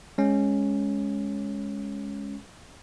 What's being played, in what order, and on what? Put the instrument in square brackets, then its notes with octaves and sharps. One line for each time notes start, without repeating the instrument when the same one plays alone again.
[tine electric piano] G#3 C#4